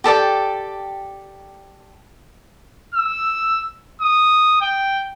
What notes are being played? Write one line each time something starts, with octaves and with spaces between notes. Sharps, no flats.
G4 A4 D5 G5
E6
D#6
G5